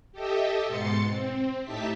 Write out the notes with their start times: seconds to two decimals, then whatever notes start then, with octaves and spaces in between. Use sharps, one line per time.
0.12 G4 A4 D#5 E5
0.67 G#2 B2 C6 A6 C#7
1.06 C4
1.63 A2 D#4 G4 E5 A5 B6